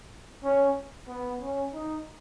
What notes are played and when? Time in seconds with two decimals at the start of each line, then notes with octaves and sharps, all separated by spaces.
0.44 C#4
1.08 B3
1.40 C#4
1.73 D#4